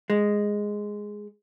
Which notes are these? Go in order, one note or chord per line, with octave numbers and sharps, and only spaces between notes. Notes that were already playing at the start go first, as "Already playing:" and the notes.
G#3